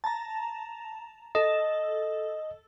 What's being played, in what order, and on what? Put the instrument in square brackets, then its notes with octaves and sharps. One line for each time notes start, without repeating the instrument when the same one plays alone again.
[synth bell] A5 A#5
[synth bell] A4 [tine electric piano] D#5